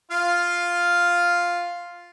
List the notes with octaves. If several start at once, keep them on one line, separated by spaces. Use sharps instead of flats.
F4 F5